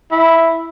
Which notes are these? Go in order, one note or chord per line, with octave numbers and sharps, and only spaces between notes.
E4